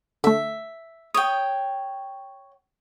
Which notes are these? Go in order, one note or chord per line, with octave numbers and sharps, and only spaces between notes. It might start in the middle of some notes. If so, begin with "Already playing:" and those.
D3 A3 E5
C#5 G5 D#6